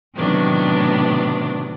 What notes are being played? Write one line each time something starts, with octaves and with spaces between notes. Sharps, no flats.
A2 C3 D#3 F#3 B3 D4